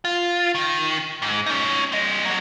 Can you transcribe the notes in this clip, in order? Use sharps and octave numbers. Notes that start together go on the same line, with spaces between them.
F4
D#3
G#2
C#4 D#4
C4 D#5
F#3 A#3